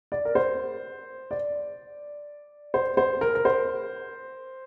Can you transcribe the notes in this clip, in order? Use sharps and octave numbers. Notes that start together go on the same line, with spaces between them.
D5
A#4
C5
D5
C5
C5
A#4
A#4
C5